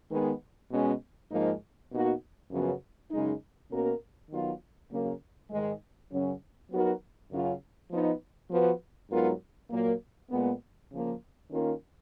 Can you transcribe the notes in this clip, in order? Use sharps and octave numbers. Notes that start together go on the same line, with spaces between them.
D#3 G#3 B3
B2 G#3 C#4
G#2 F3 A#3 D#4
B2 A#3 D#4 F#4
F#2 C#3 F3 B3 F#4
F#2 C#3 G#3 D#4
B2 A#3 C#4 F#4 A#4
D#3 F#3 B3 F4
C#3 F#3 A#3
G#2 D#3 G#3
F#2 C#3 F#3 C#4
F#3 B3 D#4 F#4 A#4
F#2 C#3 F#3 C#4 F4
F3 B3 D#4
F3 B3 F#4 B4
G#2 F#3 B3 F4 A#4
A#2 F#3 A#3
A#2 G#3 B3
C#3 F3 A#3
D#3 A#3 C#4 F4 A#4